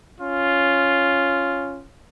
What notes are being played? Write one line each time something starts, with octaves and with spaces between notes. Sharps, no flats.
C#4 F4